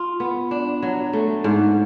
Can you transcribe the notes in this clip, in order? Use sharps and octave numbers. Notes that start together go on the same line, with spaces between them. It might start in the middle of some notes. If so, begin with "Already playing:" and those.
Already playing: F4
B3
D4
F#3
A3
G#2